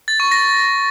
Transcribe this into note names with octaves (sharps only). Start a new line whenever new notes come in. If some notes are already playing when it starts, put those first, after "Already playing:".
A6
C#6
A#6